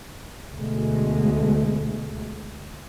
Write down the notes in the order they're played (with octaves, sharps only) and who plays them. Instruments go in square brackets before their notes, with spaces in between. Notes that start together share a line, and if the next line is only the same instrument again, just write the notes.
[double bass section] D2 B2 G#3 A3